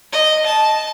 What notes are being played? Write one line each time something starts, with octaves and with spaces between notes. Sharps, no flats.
D#5
A5